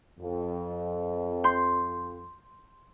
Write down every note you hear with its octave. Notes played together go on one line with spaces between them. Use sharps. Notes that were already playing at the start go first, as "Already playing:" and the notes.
F2
C6 G6